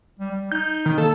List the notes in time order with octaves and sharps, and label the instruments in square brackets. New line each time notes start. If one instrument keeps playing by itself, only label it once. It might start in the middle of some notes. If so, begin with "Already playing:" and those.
[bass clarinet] G3
G3
[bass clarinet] D#4 [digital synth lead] G6
[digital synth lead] D#3
[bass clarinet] A#3 [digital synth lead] A4